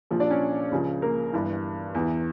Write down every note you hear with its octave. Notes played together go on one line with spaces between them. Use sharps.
A#1 A#2 F3
D4 D5
C#4 C#5
C#2 C#3 F3
A#3 A#4
G1 G2 E3
E2 E3